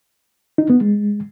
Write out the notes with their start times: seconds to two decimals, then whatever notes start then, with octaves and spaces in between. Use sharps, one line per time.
0.58 D#4
0.70 B3
0.81 G#3